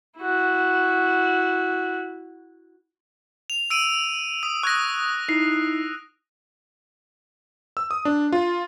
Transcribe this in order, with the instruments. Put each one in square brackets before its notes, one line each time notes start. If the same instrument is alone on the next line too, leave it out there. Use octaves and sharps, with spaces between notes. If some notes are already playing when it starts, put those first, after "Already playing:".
[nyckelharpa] E4 F#4
[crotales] F7
E6 D7 D#7
D#6
[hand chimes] C#6 D#6 G#6 [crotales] F#6 A#6
[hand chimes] D#4 E4 C7
[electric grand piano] E6
D#6
D4
F4